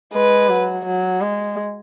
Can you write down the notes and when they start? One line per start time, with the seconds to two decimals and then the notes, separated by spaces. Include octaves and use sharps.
0.13 G#3 B4
0.49 F#3
0.86 F#3
1.21 G#3